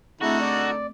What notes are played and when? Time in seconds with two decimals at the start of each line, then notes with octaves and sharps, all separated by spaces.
0.21 D3 A3 C4 D#4 E4 F#4 G#4 A4
0.41 D5